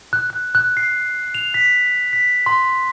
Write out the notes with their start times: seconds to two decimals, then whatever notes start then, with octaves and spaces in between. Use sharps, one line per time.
0.13 F#6
0.30 F#6
0.55 F#6
0.77 C7
1.35 F7
1.54 B6
2.13 B6
2.46 C6